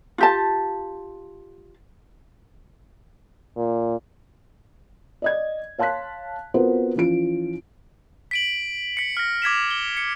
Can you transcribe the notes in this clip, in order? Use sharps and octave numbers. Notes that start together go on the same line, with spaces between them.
F4 G4 A5
A#2
D5 D#5 G#6
C#5 F5 A5 C6 F#6 B6
B3 C4 F4 F#4 A#4 C5
E3 F3 C#4 F4 D7
B6 D7 F#7
B6 C#7
F6 A#6
D6 G#6 B6 E7
G7
C#7